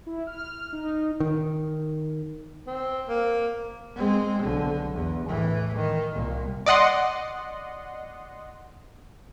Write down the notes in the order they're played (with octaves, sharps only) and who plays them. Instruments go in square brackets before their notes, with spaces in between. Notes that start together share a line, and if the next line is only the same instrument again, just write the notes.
[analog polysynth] E4
F6
D#4
[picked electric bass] D#3
[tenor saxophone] C4
A#3
[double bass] G#3 C4
B1 D3
E2
A2 E3
D#3
C2 A#2
[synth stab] D5 D#5 F#5 C6